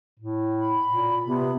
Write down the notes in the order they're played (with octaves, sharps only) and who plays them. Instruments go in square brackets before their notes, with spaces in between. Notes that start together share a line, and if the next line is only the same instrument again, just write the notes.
[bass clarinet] A2
[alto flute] B5
[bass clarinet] A#2
[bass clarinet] C3 [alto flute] B3